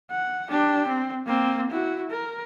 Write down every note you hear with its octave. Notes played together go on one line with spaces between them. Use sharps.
F#5
D4 G4
C4
A#3 C4
E4 F#4
A#4